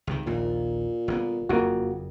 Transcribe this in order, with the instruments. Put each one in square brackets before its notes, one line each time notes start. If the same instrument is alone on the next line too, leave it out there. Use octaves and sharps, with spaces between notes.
[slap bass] C#2 C3 D#3
[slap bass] A#1 D#2 [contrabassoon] A#2
[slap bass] G1 A#3 B3
[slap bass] F#1 F2 C#3 [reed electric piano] A#3 F4 F#4